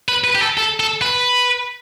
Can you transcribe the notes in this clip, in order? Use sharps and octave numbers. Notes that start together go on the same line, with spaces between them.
B4
B4
G4
A4
A4
A4
B4